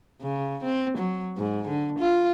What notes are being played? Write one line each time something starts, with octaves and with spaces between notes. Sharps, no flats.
C#3
C4
F#3
G#2
D3
F4